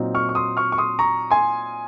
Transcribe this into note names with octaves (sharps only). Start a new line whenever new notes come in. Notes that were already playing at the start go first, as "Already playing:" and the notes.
Already playing: A#2 F#3 C4 D#4
C#6 F6
C#6
C6 D#6
C#6 F6
C#6
C6 D#6
A#5 C#6
G#5 C6